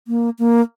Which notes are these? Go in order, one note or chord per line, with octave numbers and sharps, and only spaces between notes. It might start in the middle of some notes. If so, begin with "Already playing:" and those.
A#3
A#3